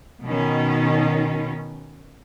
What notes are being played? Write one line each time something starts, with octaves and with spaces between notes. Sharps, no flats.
B2 D#3 C#4